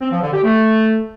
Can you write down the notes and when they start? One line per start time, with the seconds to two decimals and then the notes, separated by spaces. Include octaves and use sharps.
0.01 C4
0.11 F3
0.22 D3
0.32 G4
0.43 A3